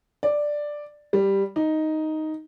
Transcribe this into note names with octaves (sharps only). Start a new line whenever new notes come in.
D5
G3
D#4